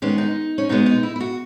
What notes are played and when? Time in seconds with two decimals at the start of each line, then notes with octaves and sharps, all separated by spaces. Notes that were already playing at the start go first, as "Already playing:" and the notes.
0.02 D#3 G#3 B3 C#4
0.18 D#4
0.58 C#4
0.69 B2 G#3 B3 D#4
0.86 D#4
1.03 E4
1.16 E4
1.21 F#4